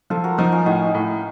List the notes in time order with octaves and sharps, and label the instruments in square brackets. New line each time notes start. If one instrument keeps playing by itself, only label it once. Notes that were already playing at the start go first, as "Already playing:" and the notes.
[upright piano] F3 [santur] F4 A4
[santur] F#4 A#4
[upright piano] F3 [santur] D#4 F#4
[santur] C#4 F4
[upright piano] A2 [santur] D#4 F#4
[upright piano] A2